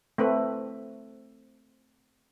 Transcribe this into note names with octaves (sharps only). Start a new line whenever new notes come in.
A3 C4 B4